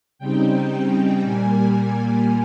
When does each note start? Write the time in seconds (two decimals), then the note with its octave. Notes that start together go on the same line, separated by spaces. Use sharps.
0.18 C#3 G3 C4 D#4 G5
1.22 A#2 G3 A#3 G#5